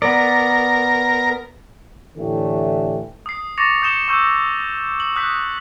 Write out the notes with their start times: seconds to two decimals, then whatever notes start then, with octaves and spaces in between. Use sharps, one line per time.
0.02 B3 A#4 D5
2.17 A2 D3 E3 A3 G4
3.26 D#6 C7
3.58 C#6 D6 A6 A#6 C#7 F7
3.82 D#6 G6 C#7 E7 G7
4.08 C#6 E6 G6
5.00 F#7
5.16 D#6 F#6 G6 B6